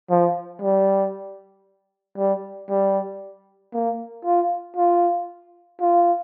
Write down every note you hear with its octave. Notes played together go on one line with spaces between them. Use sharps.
F3
G3
G3
G3
A#3
F4
F4
F4